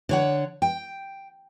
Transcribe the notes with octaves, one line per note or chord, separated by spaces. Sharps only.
D3 C#5 F#5
G5